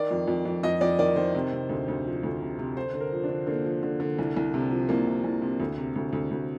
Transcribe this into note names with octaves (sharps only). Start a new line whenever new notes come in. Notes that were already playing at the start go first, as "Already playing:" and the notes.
Already playing: D#3 D5
F2
F2
F2
F2 D#5
F2 D5
D#3 D5
D#3 C5
C3
C3
D2
D2
F3
D2
C3
C3
D3 C5
D3
A#4
F3
D4
D3
D3 A#3
F3
D3
D3
C2
C2
C3
F3
C2 A#3
C3
C2
C3
D2
C3
D2
D2
D2